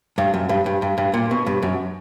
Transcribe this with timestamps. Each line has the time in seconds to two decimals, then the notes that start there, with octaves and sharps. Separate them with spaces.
0.18 G2
0.34 F#2
0.49 G2
0.66 G2
0.82 G2
0.98 G2
1.14 A#2
1.31 B2
1.46 G2
1.62 F#2